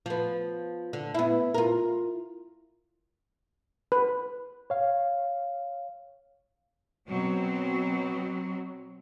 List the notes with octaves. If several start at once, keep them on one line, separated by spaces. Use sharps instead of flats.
F3 B3
D3
B3 E4
F4 A#4
B4
C#5 F5
B2 F#3 C4